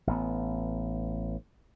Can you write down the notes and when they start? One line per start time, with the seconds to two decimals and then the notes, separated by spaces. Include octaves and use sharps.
0.07 A1 B3